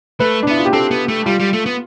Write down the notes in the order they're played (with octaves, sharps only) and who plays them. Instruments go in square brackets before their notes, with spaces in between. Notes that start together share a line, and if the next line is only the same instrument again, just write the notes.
[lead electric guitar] A3 [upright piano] B4
[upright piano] D4
[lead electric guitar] B3 [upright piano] E4
[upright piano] F4
G4
[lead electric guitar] C4 [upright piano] A4
[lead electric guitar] B3
A3
[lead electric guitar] G3 [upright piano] F4
[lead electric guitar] G3
A3
B3